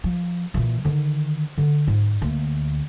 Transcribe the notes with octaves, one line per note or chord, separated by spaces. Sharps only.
F3
A#2 E3
D3 D#3
D3
G#2
D2 A#3